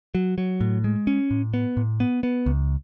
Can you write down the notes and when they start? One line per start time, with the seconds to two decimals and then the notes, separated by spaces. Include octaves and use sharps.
0.15 F#3
0.38 F#3
0.61 A2
0.84 G#3
1.07 C#4
1.31 A2
1.54 B3
1.77 A2
2.00 B3
2.23 B3
2.46 C#2